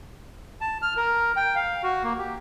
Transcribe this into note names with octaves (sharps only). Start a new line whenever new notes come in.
A5
F6
A#4
G5
F5
F#4
A#3
G4